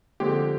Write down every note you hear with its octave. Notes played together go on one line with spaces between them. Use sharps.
D3 F3 G#3 C4 G4